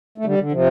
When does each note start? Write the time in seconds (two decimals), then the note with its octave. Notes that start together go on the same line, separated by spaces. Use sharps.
0.18 A3
0.25 D3 G3
0.38 D3
0.52 C3 F3